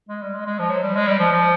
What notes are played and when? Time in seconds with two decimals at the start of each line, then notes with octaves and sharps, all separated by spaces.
0.09 G#3
0.22 G3
0.34 G#3
0.46 G#3
0.59 F3
0.70 F#3
0.83 G3
0.95 G#3
1.07 G3
1.19 F3
1.32 F3